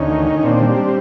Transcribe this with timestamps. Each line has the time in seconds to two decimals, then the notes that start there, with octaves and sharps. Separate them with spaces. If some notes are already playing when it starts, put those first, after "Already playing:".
Already playing: D2 C#4 D#4
0.10 D#3
0.26 D#3
0.39 D#4
0.43 A#2 C4 D4
0.60 G3
0.76 G3